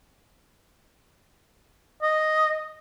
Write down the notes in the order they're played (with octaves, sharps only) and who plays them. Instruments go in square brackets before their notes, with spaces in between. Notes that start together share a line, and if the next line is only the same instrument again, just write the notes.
[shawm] D#5